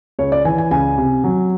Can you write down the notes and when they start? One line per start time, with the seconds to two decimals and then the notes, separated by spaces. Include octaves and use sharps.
0.19 C#2 C#5
0.32 D5
0.45 E3 G#5
0.58 G#5
0.71 C#2 G#5
0.98 C3
1.24 F#3